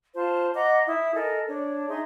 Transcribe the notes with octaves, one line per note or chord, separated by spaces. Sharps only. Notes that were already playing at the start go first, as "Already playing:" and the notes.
F4 C5 A5
D#5 F#5 A#5 D6
E4 E5 D#6
A4 A#4 D#5 G#5
D4 C#5
D#4 G#4 E5 C6